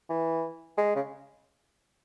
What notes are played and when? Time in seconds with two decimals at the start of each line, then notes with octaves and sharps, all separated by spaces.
0.10 E3
0.78 G#3
0.96 C#3